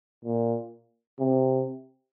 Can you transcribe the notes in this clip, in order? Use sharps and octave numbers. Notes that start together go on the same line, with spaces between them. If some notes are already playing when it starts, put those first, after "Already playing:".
A#2
C3